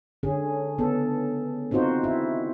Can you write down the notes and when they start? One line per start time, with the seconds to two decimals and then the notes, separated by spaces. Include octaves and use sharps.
0.23 D3 C#4 G#4
0.78 C#3 B3 A4
1.71 C4 D#4 F4 F#4 C5
2.04 E4